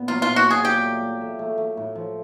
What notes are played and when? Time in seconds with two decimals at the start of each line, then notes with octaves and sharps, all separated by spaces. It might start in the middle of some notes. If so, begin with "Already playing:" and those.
Already playing: A#2 B3
0.08 F#3 F4
0.22 F4
0.27 A#2
0.36 F#4
0.46 A#2 G#4
0.65 F#4 G4
0.83 A3
1.01 A3
1.21 A3
1.39 A3
1.58 A3
1.77 A2
1.95 F3